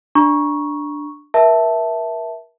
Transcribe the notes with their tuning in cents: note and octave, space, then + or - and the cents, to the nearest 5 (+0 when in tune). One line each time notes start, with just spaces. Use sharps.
D4 +5 A#5 +30 C#6 +0
A#4 +40 E5 -10 A5 +0